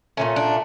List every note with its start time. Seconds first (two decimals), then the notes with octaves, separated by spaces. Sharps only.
0.17 A#2 F3 A3 C#4
0.36 D4